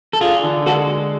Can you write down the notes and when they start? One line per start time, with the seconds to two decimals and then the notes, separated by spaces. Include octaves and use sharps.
0.13 A4
0.21 D4 F4 G#4
0.43 D3
0.66 G#3 F#4 A4